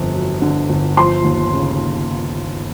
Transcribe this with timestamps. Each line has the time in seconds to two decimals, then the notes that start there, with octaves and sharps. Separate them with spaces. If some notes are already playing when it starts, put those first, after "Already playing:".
Already playing: G1 F2
0.14 F#3
0.42 D3
0.69 G1
0.97 F3 C6
1.24 D#2
1.53 C#3